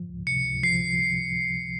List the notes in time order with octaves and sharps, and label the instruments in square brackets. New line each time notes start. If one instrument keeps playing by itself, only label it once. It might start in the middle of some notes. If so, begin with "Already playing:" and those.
Already playing: [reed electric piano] F3
C#2
[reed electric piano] C3 [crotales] C#7
[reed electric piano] C#2
[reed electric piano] F3 [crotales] C7